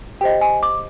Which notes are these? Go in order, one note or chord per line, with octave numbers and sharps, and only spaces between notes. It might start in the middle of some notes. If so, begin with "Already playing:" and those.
G4 C5 D#5 G5
G#5
D6